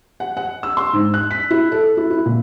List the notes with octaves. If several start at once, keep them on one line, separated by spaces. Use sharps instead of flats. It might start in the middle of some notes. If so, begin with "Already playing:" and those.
F#5
F#5
E6
C6
G#2
F#6
B6
E4
A4
E4
E4
A#2